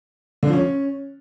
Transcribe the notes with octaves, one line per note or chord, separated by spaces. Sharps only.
D3
F3
C#4